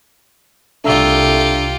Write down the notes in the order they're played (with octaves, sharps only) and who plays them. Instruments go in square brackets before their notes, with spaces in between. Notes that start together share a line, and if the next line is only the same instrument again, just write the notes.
[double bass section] C2 [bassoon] A3 [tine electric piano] D4 A#5 E6 [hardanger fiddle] F4 G4